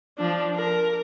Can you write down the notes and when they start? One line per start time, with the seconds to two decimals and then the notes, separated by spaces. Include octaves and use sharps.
0.18 F3 D4
0.56 A#4